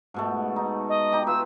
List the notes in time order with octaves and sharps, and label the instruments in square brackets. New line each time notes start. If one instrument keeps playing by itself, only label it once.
[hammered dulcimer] G#2 B2 A3
D#4
[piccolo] D#5
[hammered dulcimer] D#4 G4
[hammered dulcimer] F4 B4 [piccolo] E6